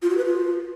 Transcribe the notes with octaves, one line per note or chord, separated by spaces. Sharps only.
F4
F#4
B4
F4